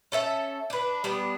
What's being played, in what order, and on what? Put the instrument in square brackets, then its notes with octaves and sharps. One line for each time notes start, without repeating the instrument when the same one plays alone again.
[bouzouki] C#4 A4 E5
D4 B4
G3 B3 D4